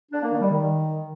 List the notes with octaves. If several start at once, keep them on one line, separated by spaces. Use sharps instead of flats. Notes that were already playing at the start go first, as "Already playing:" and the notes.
D4
A#3
D#3
G3
D#3